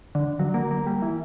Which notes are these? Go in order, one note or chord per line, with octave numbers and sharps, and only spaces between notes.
D3
F#3
A#3
A#3
G3
E3